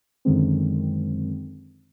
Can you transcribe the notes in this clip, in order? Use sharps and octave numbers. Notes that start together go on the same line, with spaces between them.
F#2 D3 D#3 G#3 C4